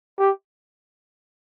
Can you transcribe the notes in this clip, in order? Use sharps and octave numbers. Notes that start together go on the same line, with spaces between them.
G4